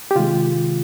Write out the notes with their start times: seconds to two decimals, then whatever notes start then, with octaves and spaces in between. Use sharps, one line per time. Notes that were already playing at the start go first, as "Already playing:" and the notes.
0.11 G4
0.15 C3 D#3 G#3 F4